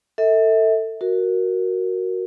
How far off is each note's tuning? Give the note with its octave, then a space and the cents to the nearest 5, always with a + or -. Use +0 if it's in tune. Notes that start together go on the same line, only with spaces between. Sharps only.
A4 +25 E5 -35
F#4 +0 A#4 +0